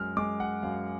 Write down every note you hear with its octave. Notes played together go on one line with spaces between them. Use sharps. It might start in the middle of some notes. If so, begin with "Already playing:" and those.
Already playing: F#2 G#3 F6
G#3 D6
F#5
F#2 F5